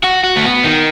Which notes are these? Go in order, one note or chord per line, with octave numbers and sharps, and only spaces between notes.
F#4
F#4
A3
B3
D#3